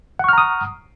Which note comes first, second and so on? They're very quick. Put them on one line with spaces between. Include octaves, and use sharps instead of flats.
F#5 C#6 F6 A#5 D#6